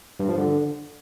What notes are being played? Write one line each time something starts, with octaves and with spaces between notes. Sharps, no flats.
G2
F3
D3